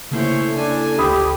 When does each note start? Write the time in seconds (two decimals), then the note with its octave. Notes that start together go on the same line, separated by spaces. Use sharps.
0.11 C#3 A3 A#3 E4 C5 C#5
0.54 D4 A4 G#5
0.98 G1 D2 G4 B5 D#6